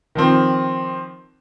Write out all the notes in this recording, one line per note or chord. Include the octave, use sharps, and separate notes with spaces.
D#3 F3 C4